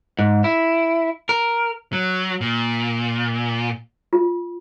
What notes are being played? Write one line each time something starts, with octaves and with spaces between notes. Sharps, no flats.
G#2
E4
A#4
F#3
A#2
F4